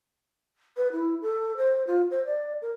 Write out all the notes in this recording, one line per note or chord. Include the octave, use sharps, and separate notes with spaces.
B4
E4
A4
C5
F4
C5
D5
A#4